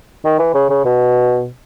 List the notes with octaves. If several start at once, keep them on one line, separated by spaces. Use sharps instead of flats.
D#3
E3
C#3
C#3
B2